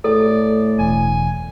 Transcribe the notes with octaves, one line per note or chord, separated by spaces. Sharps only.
A2 A4 D5
E1 G#5